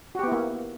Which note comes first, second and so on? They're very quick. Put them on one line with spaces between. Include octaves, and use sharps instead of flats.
F#4 G4 B3 E4 A#3